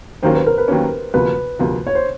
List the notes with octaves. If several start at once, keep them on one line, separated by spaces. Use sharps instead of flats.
D#2 D#3 F#3 A#3 C#4 C5
B4
A#4
B4
D#2 D#3 F#3 A#3 C#4
D2 C3 F3 A#3 B4
D2 C3 F3 A#3
C#5
C5